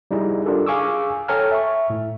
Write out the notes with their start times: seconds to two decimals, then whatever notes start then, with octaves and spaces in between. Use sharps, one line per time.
0.11 G3 D#4 E4 G#4
0.45 D4 F4 G4 A4 A#4
0.66 G#4 F5 G#5 C#6 D6 E6
1.28 A4 C#5 G5 G#5 A#5 F6
1.52 E5 C#6
1.90 A2